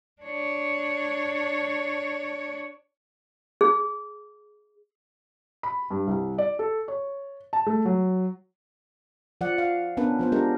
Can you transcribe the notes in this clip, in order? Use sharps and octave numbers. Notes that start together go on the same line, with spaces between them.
D4 C#5
G#4
B5
G2
C2
D5
A4
C#5
A5
A3
F#3
F3 D5 F#5
F5
B3 C#4 D4 A#4 B4
F3 B3 C5
G#3 D4 G4 A#4